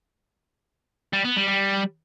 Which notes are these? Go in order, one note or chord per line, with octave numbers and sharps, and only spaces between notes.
G3
B3
G3
G3